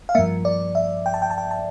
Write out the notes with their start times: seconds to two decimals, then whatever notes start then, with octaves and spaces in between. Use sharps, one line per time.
0.09 F5
0.15 G2 F3 A#3 E5
0.45 D5
0.75 E5
1.06 G5
1.14 A5
1.22 G5
1.30 A5
1.38 G5
1.51 A5